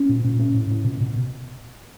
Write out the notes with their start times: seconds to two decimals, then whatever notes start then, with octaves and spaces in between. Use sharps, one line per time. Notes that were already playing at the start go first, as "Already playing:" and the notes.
Already playing: C#4
0.09 A#2
0.24 A#2
0.39 A2 C#4
0.54 A2
0.70 A2
0.84 B2
1.00 B2
1.16 B2